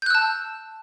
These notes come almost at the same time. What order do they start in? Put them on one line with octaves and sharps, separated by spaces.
G6 F#6 E6 A5